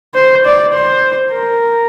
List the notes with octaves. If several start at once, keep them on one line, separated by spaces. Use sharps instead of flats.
C5
D5
C5
A#4